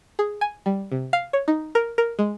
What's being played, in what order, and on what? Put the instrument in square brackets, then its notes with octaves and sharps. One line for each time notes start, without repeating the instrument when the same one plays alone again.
[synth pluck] G#4
G#5
G3
C3
F5
C#5
D#4
A#4
A#4
G#3